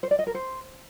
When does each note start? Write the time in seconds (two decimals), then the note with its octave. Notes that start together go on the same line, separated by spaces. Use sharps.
0.03 C5
0.11 D5
0.19 D#5
0.27 A#4
0.35 C5